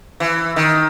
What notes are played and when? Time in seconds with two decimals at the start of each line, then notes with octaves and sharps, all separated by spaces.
0.20 E3
0.56 D#3